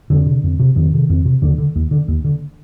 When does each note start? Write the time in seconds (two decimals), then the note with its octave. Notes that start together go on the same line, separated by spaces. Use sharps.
0.10 F2 D3
0.26 C3
0.43 F2
0.60 C3
0.76 F2 D#3
0.93 C3
1.10 F2
1.25 C3
1.42 D#2 D3
1.58 D3
1.76 D#2
1.91 D3
2.08 D#2
2.24 D3